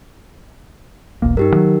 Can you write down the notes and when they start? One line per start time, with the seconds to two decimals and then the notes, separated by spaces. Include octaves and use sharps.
1.22 E1 B1 A#3
1.37 G2 D#4 G4 A#4
1.52 D#3 F3 F#3